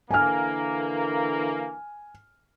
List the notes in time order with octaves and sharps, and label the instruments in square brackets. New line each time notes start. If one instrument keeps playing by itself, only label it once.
[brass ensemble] D3 E3 A#3 [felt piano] G#5 F6